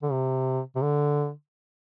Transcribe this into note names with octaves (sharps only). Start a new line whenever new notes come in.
D3
C3
C3
D3